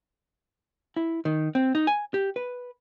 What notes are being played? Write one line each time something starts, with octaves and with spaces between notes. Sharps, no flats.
E4
D#3
C4
D#4
G#5
G4
B4